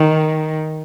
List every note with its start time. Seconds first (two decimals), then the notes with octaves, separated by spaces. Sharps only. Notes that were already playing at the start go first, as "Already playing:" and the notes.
Already playing: D#3